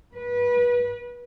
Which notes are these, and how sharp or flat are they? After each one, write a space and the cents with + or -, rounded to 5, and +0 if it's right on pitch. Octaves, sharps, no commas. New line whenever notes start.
B4 -25